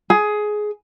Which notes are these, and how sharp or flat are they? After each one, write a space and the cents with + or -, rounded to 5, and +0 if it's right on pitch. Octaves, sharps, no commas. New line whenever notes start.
G#4 +15